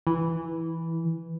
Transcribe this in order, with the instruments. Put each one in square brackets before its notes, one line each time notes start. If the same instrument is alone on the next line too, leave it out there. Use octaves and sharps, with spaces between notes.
[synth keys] E3